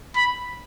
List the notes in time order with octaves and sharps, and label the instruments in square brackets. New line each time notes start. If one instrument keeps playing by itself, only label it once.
[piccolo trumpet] B5